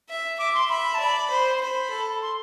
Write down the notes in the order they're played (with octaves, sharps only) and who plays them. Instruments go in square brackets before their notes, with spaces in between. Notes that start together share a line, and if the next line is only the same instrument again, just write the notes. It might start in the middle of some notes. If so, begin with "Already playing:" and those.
[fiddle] E5
[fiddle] E5 [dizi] D6
[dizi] C6
[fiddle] E5 [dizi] B5
[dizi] B5
A5
[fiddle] D5 [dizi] B5
[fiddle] C5
[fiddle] C5 [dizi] B5
[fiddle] A4
[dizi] C6